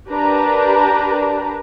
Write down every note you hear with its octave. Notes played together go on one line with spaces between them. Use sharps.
D4 G4 A#4 B4 A#5